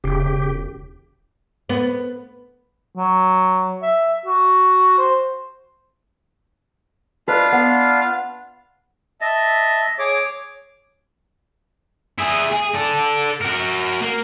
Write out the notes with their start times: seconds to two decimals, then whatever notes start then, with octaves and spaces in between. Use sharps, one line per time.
0.04 E1 C#3 G4
1.69 B3
2.97 F#3
3.82 E5
4.26 F#4
4.98 C5
7.28 D4 F4 B4 D#5 F5
7.52 B3
9.21 D#5 E5 A5
9.99 G#4 C#5 D6
12.18 E4 G#4
12.52 G#4
12.74 A4 D5
13.41 F#4 A#4
14.01 A#3